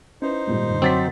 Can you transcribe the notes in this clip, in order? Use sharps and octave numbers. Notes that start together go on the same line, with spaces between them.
C#4 D#4 E4 B4 C5
G#1 A#2 G3
F#2 D3
F#3 C4 D6 A6 B6